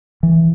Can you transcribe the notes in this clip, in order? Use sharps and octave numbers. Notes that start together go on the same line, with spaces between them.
E3